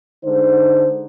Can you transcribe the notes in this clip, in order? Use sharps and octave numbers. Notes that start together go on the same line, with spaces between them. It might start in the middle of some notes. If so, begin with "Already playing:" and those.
D3 G#3 D#4 C5